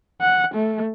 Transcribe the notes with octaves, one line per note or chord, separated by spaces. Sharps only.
F#5
A3